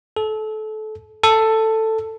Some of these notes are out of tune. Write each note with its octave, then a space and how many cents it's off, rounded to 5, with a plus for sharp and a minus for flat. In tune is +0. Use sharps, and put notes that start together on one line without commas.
A4 -25
A4 +10